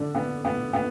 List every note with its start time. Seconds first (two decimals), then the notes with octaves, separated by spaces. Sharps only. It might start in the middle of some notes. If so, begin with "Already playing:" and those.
Already playing: D3 D4
0.15 B3
0.45 B3
0.73 B3